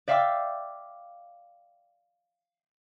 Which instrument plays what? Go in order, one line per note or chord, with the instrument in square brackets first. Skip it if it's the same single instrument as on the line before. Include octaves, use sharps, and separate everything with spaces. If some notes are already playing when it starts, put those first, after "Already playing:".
[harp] D5 E5 F5 G5 D6 E6